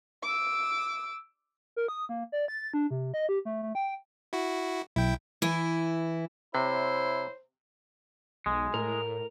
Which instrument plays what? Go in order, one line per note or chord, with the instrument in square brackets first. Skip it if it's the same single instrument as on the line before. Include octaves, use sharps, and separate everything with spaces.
[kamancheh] D6 E6
[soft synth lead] A#4
D#6
A#3
D5
A6
D4
C3
D#5
G4
A3
A3
G5
[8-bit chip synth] E4 F#4
[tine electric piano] B1 [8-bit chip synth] E4 G5
[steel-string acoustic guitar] E3 E4
[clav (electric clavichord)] C3 [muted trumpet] E4 [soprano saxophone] C5 [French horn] C#5
[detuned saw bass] B1 [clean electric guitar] G#3
[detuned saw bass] A2 [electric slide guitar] A#4